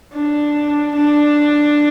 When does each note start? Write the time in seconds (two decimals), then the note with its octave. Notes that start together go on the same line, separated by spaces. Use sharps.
0.14 D4
0.95 D4